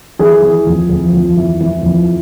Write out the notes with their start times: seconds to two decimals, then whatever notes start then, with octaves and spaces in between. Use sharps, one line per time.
0.19 E3 G#4
0.42 E3
0.67 F2
0.89 F2
1.13 F2
1.37 E3
1.60 E3
1.83 F2